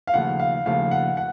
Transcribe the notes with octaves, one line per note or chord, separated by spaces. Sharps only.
F5
D#2 C#3 F3 A3 F#5
F5
D#2 C#3 F3 A3 F5
F#5
F#5